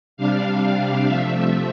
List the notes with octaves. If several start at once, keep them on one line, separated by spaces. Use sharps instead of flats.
C3 G3 D4 F5
C3 F3 A3 E5